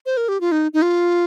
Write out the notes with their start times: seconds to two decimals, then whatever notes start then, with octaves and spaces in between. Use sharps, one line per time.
0.06 C5
0.17 A#4
0.29 G4
0.41 F4
0.52 D#4
0.74 D#4
0.82 F4